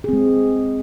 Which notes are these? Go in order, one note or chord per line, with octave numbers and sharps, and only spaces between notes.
G#3 C4 G#4